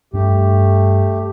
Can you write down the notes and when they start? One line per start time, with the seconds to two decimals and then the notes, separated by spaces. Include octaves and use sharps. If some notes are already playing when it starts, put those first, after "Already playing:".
0.13 G2 A3 D4 G4